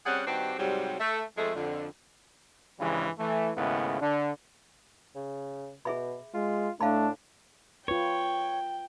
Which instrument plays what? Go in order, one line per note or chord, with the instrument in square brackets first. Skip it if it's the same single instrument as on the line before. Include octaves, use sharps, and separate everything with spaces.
[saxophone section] G3 C4 C#4 G#4 F#5
G2 D#3 C4 D4 F#4 G4
G#2 C3 F#3 G3
A3
F2 F3 G#3 A3
F2 D3
[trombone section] G2 C#3 E3 F3 G3 G#3
E3 A3
D#2 G#2 C#3 A3 B3 E4
D3 D4
[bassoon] C#3
[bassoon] B2 [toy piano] G#4 E5 B5
[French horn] G#3 [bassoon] F4
[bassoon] A2 [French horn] A3 [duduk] D4 [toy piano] F5 A5 B5
[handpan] F4 B4 [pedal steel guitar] C#5 [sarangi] G5